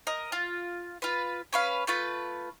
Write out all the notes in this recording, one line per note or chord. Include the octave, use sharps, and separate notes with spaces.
A#4 D#5
F4
F4 B4
C#4 B4 F5
A3 F4 B4